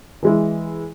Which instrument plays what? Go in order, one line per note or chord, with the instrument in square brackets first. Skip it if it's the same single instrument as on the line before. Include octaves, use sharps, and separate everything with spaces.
[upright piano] E3 G#3 E4